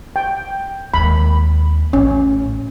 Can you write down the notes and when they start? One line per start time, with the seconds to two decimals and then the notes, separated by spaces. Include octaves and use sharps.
0.16 G5
0.94 D#2 G#3 B5
1.93 A1 C#4